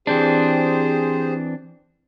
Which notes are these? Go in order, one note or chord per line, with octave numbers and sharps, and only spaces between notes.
E3 C4 D4 G4 G#4 C5